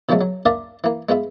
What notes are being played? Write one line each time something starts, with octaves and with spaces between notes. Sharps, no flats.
B2 D3 F3 F#3 G#3 A3
F#3
A#3 D4 A#4 D5 E5 F5
E3 A#3
G#3 B3 F4 E5